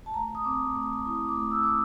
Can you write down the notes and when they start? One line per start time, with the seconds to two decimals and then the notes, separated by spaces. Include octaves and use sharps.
0.06 A5
0.14 A3 A#5
0.35 D#6
0.44 C4 D6
0.75 A3 D#6
1.05 E4 D#6
1.29 D6
1.36 A3
1.51 E6
1.63 A3 D6